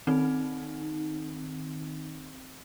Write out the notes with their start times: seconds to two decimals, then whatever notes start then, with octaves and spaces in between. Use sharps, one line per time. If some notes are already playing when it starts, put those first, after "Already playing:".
0.07 D#3 C4 D#4